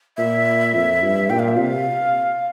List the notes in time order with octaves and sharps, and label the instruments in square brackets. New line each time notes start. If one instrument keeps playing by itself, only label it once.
[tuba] A#2 [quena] E5
[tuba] F2
G2
[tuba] A#2 [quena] G5
[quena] F5
E5
[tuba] C3 [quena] F5